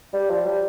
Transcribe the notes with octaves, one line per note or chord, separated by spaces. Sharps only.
G3
F3
G3